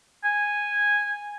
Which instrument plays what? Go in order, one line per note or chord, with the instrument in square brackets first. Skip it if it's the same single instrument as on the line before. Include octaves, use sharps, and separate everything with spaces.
[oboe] G#5